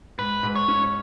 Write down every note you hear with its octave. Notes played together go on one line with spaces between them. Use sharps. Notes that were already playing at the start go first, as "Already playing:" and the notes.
G#2 B4
G#2
C#5
C#4